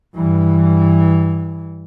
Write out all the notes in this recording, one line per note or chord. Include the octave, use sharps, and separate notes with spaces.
G2 E3